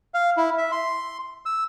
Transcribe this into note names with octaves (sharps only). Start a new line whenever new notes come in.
F5
E4
E5
C6
E6